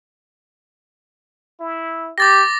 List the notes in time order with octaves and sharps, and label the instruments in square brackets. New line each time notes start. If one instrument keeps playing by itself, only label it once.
[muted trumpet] E4
[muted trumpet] G4 [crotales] D6 A6 A#6